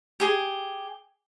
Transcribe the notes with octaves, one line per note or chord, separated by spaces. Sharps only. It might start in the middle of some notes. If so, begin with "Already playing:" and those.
G4 G#4